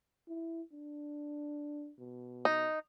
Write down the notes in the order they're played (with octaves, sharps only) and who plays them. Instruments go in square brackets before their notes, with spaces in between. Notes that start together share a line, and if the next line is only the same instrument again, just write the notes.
[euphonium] E4
D4
B2
[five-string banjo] D#4